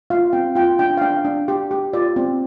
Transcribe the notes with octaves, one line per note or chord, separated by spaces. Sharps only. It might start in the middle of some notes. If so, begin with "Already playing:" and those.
F4 F5
C4 G5
F4 G5
D4 G5
F5
D4 G5
D4
G4
G4
F4 D5
C4